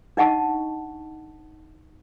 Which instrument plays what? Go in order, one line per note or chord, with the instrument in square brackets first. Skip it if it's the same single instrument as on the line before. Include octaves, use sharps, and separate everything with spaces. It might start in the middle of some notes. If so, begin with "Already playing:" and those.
[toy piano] D4 D#4 D#5 F#5 A5 C#6